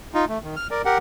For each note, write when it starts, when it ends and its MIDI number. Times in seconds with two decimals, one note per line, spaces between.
0.14 0.25 63
0.14 0.25 65
0.29 0.39 57
0.43 0.55 51
0.56 0.67 89
0.71 0.82 70
0.71 0.82 74
0.85 0.98 67
0.85 0.98 70
0.85 0.98 78